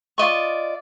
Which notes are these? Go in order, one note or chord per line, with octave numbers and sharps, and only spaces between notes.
F4 D5 D#5 C#6